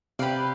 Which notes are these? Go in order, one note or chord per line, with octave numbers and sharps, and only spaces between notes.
C3 G4 B4 D5 F5